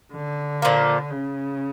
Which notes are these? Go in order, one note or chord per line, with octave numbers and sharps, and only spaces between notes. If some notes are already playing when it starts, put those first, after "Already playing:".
D3
A#2 F3 A#3
C#3